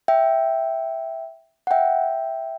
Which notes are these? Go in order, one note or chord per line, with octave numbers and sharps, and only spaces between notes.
E5 G5
F#5
E5 G5